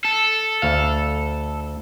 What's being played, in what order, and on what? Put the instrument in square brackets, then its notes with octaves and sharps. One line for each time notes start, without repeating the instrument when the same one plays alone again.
[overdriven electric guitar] A4
[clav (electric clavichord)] D2 F5